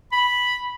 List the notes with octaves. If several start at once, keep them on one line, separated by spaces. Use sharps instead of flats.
B5